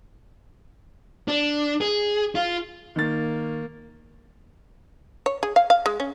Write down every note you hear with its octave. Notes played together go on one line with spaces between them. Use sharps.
D4
G#4
F4
D#3 A#3 A6
C#5
G#4
F5
F5
G#3
C#4